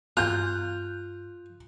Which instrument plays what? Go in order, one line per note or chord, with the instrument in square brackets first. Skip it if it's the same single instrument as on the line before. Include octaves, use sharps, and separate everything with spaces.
[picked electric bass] G2 B3 [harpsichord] F4 A#5 [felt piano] F#6 G6